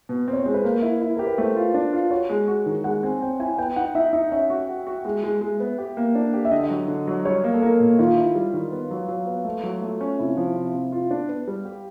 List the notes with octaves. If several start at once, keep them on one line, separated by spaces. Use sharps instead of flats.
B2
C4
C#5
G#3 C5
B4
A#3 A#4
E4
E4
G4 A#4
B4
A3 C5
F4
D4
F4
F#4 C#5
G#3
F#4
D#3
G#3 F#5
C4 G#5
C4 G5
E4 G#5
B3 G5
D#4 F#5
D#4 E5
D#4 E5
C#4 E5
F#4
F#4
F#4
G#3
G#3
G#3
B3
G4
A#3
D4
G4
E5
D3 D#5
F#3
D3
F#3
G3 C#5
A#3
A4
A#3 A#4
A#2
D#3 F4
E4
G3
D#3
B3
F#3
F#3
B3
A3
F#3
A3
C#4
C3 E4
F3
C3
C3
F4
D4
B3
G3
G4